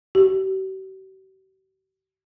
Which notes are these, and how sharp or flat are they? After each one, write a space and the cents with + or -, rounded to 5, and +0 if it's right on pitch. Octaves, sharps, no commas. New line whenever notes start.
G4 -45